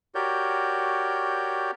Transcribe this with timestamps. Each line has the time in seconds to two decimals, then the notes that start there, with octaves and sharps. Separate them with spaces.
0.15 F#4 G4 A#4 C#5 D5 G6